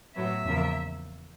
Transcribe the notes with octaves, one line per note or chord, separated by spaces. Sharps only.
A2 F#3 B3 E5
E2 C#3 F3 A#3